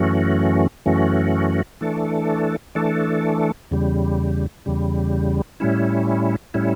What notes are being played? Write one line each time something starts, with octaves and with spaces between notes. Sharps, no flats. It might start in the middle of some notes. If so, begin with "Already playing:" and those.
Already playing: F#2 E3 A3 C#4 F#4
F#2 E3 A3 C#4 F#4
E3 A3 D4 A4
E3 A3 D4 A4
E2 C#3 G3
E2 C#3 G3
A2 G3 C#4 E4
A2 G3 C#4 E4